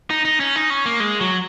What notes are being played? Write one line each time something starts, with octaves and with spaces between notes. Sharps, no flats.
D#4
D#4
C#4
D#4
C#4
A#3
G#3
F#3